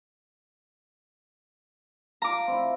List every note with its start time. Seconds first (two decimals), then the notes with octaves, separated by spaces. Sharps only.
2.22 F4 A#5 D6
2.48 C4 E4